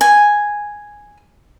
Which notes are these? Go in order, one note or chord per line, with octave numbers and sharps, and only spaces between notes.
G#5